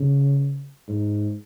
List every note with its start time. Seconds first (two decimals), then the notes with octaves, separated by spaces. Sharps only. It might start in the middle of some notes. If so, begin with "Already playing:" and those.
Already playing: C#3
0.89 G#2